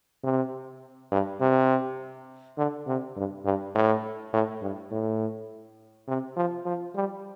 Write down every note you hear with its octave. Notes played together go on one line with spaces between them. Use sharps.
C3
G2
C3
D3
C3
G2
G2
A2
A2
G2
A2
C3
F3
F3
G3